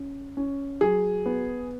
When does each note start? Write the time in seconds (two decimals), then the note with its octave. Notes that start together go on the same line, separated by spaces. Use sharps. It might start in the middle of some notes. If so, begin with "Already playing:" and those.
Already playing: C#4
0.37 C#4
0.81 F#3 G#4
1.26 B3